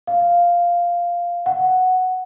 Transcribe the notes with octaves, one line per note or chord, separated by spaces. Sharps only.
F5
F#5